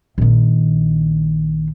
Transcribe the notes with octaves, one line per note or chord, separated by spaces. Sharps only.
A#1 D#3